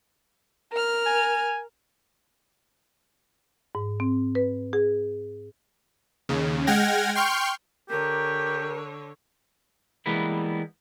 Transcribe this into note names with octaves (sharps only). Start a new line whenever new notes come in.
A#4 F6
G#5
G#2
C4
B4
G#4
D#2 C#3
G#3 F#5 G5 F6 G#6 A#6
G5 C6 C#6 F6 G6
D3 G4 A#4 C#5
E3 G3 G#3 A#3 B3 E4